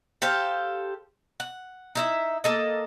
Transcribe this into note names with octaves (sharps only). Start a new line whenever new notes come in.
G4 A4 C5 F5
F#5
D#4 E4 E5
A#3 A4 D#5